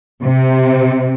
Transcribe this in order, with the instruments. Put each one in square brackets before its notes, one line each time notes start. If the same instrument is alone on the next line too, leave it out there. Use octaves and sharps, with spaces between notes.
[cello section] C3